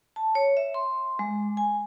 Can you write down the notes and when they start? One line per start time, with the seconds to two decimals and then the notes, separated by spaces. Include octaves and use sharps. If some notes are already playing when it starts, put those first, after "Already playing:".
0.16 A5
0.35 C#5
0.57 E5
0.74 C6
1.19 G#3
1.57 G#5